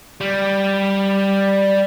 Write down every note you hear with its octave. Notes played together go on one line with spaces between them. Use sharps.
G3